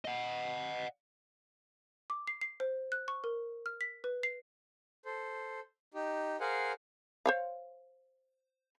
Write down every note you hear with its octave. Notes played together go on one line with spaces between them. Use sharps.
D#5 F#5
D6
C7
C7
C5
F#6
C#6
A#4
F6
B6
B4
C7
A4 C5
D#4 G4
G#4 A#4 C5 F5 F#5 G#5
C5 C#5 F5